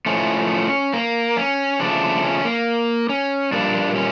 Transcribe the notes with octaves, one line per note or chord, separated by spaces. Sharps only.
A2 F3 A3 C#4
A#3
C#4
C#3 F3 A3 D4
C#4
A#3
C#4
A#2 G3 A#3 D4
C#4